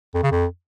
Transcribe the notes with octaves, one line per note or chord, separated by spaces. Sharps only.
F2
C#3
F2